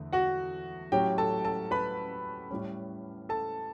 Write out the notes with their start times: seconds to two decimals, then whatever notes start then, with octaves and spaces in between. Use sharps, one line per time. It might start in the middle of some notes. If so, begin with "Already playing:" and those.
Already playing: E2 D3 A3
0.13 F#4 F#5
0.92 A2 F#3 C#4 G4 G5
1.18 A4 A5
1.45 A4 A5
1.71 B4 B5
2.50 A2 G3 C#4
3.29 A4 A5